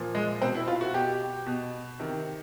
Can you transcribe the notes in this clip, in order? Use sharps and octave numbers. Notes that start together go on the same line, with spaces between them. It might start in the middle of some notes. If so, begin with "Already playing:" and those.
Already playing: A#2 F3
G#3
B2 C4
E4
F4
F#4
B2 G4
B2
C3 D#3